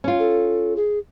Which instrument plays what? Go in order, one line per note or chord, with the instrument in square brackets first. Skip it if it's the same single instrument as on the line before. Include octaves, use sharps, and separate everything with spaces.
[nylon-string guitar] C#4 F4
[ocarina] A4
G#4